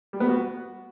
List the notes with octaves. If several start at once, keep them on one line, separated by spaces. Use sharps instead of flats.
G3
B3
F#4